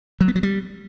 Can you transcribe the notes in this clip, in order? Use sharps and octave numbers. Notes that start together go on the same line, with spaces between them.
F#3
B3
F#3
G3